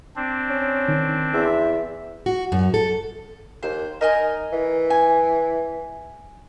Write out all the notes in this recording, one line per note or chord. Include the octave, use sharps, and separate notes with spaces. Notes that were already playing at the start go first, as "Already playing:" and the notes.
C4 D4
C#4
D#3
E2 E5
F#4
F#2
A4
D#2 C5
D#4 A#4 D#5 G#5
E3
G#5